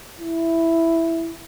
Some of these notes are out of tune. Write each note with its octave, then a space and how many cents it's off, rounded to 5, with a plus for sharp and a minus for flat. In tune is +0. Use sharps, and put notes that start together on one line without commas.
E4 +5